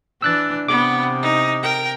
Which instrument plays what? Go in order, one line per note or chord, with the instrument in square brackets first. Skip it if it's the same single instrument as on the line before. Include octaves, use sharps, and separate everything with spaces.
[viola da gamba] E3 D4 [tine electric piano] E6 F#6 A6
[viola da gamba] C3 [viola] B3 [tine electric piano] D6
[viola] D#4
A#4 G5